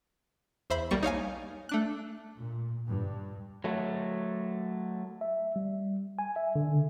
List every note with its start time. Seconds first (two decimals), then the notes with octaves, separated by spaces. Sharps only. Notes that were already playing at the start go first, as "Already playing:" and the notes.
0.70 E2 C5 E5 B5
0.91 B1 G3 A#3 C#6
1.03 D#4 C#5 F5 G#5
1.69 A3 D4 F#6
2.36 A#2
2.87 G2
3.64 F#3 A3
5.21 E5
5.56 G3
6.19 G#5
6.36 E5
6.56 D3
6.75 C#3